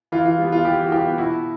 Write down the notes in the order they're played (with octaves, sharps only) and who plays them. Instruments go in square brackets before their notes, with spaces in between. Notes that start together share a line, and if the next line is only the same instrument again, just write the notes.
[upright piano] E3 F4
F4
G3 B3
F4
E3 F4 G4
F#4
G3 B3 F4 G4
B2 E4 F#4